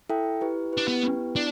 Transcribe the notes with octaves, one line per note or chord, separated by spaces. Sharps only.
E4 A4 E5 G5
E4 G4 B4
D4 E4 G4 B4
B3
B3 E4 G4 B4 G5
B3 D4 E4